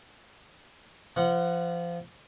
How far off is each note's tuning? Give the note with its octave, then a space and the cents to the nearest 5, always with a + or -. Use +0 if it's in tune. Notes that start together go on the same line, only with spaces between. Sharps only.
F3 -25 F#5 +0